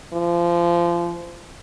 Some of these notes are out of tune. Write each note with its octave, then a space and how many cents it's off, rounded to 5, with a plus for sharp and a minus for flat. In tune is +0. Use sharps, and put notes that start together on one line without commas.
F3 -25